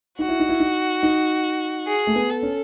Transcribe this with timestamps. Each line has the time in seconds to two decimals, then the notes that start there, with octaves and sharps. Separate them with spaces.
0.19 D#4 F#4
0.29 E4
0.39 D#4
0.49 E4
0.60 D#4
1.03 D#4
1.87 G#4
2.07 A3
2.15 B3
2.29 A4
2.43 C#4